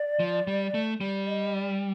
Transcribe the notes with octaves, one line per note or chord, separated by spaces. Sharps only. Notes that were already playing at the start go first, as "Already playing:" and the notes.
Already playing: D5
F3
G3
A3
G3 D5
D#5
D5